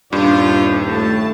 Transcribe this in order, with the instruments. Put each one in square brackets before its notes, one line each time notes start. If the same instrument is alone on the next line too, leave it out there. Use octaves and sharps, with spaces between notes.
[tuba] D#1 [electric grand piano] G2 [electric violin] D4 [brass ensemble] F4
[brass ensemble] A2 A5 [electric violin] A3